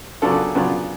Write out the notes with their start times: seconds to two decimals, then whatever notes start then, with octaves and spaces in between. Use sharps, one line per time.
0.22 C#3 F#3 B3 D4 F4 A4
0.55 C#3 F#3 B3 D4 F4